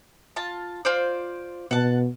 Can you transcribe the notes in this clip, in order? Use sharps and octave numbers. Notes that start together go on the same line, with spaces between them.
F4 A5
F4 C5 D5
B2 F#5 A5